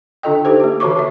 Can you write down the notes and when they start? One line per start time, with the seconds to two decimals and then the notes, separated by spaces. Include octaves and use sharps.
0.23 D3 D4 F4 A4 D#5 G5
0.45 D#4 G4 A4 C5
0.60 A#3 G4
0.80 D3 E3 F#4 C#5 C#6 D6
0.96 D3 F#4 E5